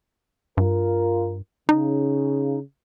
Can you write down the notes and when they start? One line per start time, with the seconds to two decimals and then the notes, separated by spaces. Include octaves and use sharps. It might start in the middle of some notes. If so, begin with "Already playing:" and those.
0.57 G2 F4 A#4
1.69 C#3 D#4